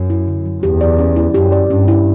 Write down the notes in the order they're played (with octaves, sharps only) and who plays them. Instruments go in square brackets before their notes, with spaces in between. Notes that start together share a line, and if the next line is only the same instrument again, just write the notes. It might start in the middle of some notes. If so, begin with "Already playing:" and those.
Already playing: [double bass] F#2
[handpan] E4
D3
F#3
[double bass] E2 [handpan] G4
[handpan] D5
C#4
E4
[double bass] F#2 [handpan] G4
[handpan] D5
[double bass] G2 [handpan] C#4
[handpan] E4